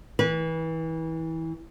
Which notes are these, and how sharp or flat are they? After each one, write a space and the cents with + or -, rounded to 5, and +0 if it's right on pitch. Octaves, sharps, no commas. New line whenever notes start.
E3 -25 B4 -25